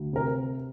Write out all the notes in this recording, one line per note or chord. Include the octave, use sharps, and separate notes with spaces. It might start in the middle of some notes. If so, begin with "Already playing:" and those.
Already playing: D2
C3 A#4